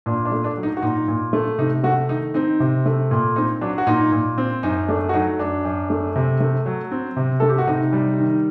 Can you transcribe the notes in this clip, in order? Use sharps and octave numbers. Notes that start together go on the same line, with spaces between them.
A#2 D4
D4
A3
D4
F#3
D#4
F#4
A#2 D#4
A#2
A3
C3 D#4
A3 F#4
D#3 D#4
C4 D#4
C3
A3
A#2
C4 D#4
F#3 D4
F#4
A#2 D#4
A#2
C4
F#2 D#4
A3 D4
F#4
F#3 D#4
F#2 D4
F#2
A3
C3
A3
F#3
C4
C3
A3 A4
G4
F#4
C3 D#4
G3
D#3